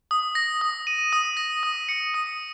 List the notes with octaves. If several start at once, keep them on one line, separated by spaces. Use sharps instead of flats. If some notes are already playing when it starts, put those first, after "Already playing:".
D#6
A#6
D#6
D#7
D#6
A#6
D#6
C#7
D#6